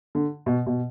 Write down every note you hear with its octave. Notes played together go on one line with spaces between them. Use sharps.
D3
B2
B2